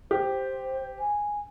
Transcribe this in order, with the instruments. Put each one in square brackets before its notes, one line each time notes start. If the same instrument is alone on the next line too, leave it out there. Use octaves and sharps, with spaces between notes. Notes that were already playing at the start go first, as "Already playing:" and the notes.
[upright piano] G4 [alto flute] C5
[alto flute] G#5